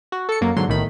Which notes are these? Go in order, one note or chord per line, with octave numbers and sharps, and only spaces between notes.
F#4
A4 C#7
F#2 F#3 A#3
G#2 D3 F#3 C6
B1 A2 D#3 B5